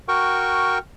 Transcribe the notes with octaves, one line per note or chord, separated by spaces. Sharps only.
F#4 A#4 G5 C#6